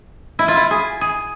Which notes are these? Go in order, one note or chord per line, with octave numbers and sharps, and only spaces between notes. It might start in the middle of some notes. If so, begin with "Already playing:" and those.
E4
F4
E4
G#4
G#4